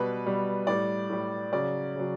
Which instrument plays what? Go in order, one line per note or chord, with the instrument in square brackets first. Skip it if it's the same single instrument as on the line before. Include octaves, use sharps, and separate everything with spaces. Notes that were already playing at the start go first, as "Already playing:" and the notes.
Already playing: [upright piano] B2 G3 B4
B2 G3
A2 G3 D5
A2 G3
C#3 F#3 D5
C#3 F#3